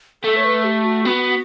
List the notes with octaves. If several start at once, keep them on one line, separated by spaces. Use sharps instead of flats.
A3 A4
C#5
B4
G4
F#4
B3 F#4